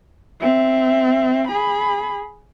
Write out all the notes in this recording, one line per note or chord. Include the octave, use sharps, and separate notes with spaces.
C4 E5
G#4 B5